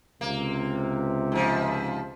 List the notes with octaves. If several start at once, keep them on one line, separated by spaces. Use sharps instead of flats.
C#2 C3 A#3
G#2 F3